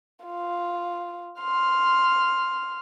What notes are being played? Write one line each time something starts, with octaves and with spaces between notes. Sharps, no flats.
F4
C6 F6